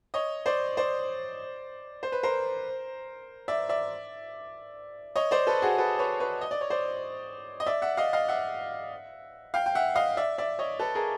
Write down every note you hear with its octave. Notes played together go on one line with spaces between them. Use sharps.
C#5 D#5
C5 D5
C5 D5
C5
B4
A#4 C5
D5 E5
D5 E5
C#5 D#5
C5 D5
A4 B4
F#4 G#4
A4 B4
B4 C#5
B4 C#5
D#5
D5
C#5
C5 D5
D#5
D5 E5
E5 F#5
D#5 F5
D#5 F5
E5 F#5
F5 G5
G5
E5 F#5
D#5 F5
D5 E5
D5 E5
C#5 D#5
A4 B4
G#4 A#4